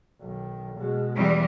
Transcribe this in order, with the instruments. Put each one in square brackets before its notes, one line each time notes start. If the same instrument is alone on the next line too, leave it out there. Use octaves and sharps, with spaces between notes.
[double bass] B1 D#3
B2 G#3
[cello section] E2 G3